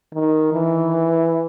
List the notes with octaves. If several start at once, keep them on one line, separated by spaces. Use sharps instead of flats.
D#3
E3